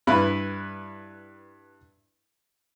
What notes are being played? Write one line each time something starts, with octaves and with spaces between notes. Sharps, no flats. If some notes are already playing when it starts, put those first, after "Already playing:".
G2 E4 B4 B5